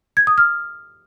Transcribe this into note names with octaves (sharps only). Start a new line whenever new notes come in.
G#6
D#6
F6